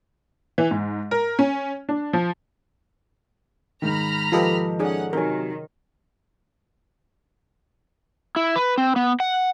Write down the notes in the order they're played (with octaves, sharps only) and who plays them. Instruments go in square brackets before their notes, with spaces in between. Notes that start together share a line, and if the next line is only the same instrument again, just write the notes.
[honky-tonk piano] E3
G#2
A#4
C#4
D4
F3
[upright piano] G#2 D#3 [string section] A#5 B5 F6
[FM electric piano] F3 A4 D#5 [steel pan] F4 G4 B4
[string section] C#4 F#5 [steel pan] D#4 G#4 D5
[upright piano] C3 F#3 G#5 [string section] D#3 [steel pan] A#4 C#5
[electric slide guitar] E4
B4
C4
B3
F#5